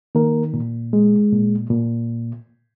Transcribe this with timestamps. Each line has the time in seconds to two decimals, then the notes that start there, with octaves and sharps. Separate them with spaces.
0.15 D#3 A#3 A#4
0.54 A#2
0.93 G#3
1.32 A#2
1.70 A#2